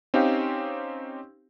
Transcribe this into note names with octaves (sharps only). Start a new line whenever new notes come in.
C4 C#4 D#4 G4 F5 G5